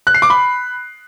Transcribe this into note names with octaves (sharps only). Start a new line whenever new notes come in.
F#6
C7
D6
B5